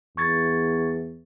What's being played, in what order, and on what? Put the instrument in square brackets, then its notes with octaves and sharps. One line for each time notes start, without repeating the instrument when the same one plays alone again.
[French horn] E2 [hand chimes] C#6 G#6 A6